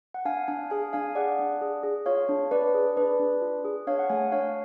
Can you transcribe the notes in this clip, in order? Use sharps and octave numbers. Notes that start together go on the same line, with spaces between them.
F#5
D4 F5 G#5
D4 F5 G#5
G#4 F5 G#5
D4 F5 G#5
G#4 D5 F#5
D4
G#4
G#4
F4 C#5 F5
D4
D4 B4 D5
G#4
D4 B4 D5
D4
F4
G#4
D4 C#5 F5
F#5
A3 F5 G#5
D4 C#5 F5